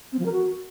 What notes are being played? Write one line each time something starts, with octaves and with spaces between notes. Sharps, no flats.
C4
F3
A#4
F#4